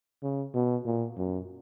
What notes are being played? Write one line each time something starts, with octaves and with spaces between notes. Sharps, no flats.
C#3
B2
A#2
F#2